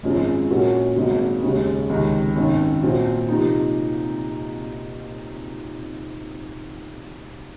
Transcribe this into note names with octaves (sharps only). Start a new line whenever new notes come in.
G#1 F#2 F3 G#3
A#2 F#3 C#4 F#4 A#4
G#1 G#2 F#3 A#3
D#2 C#3 G#3
C#2 C3 D#3
G#1 F#2 D#3
A#2 F#3 C4
C3 F3 A#3 D#4